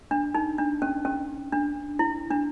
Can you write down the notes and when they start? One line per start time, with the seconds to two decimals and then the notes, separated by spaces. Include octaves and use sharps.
0.11 D4
0.35 D#4
0.58 D4
0.82 C#4
1.05 C#4
1.52 D4
1.99 E4
2.31 D4